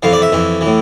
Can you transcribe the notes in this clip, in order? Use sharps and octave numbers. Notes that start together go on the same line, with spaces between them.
F2 E3 F5
D5
E5
F2 E3
A2 E3